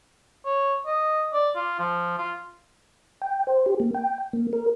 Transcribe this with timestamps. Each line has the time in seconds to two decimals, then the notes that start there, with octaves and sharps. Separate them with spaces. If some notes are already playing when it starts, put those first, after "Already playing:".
0.45 C#5
0.86 D#5
1.33 D5
1.55 F4
1.79 F3
2.18 F4
3.22 G5
3.47 C5
3.66 G4
3.80 A#3
3.95 G5
4.33 A#3
4.53 A#4